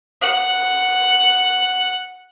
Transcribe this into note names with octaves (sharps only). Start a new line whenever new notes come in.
F#5 F#6